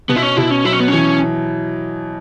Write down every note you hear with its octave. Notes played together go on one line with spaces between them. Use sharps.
B2 B3
E4
C#4
B2 E4
C#4
F#3 E4
C#4
B3
E3 C#4